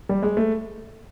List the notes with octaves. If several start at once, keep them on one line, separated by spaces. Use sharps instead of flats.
G3
G#3
A3